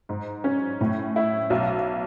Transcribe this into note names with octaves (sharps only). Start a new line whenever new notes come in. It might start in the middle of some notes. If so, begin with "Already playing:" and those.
G#2
C#4
A2
E4
B1